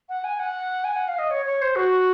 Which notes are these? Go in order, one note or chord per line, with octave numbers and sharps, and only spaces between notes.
F#5
G#5
F#5
G#5
F#5
F5
D#5
C#5
C#5
C5
F#4